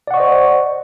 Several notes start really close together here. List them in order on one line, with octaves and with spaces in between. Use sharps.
D5 F#5 C#6 D#5 C5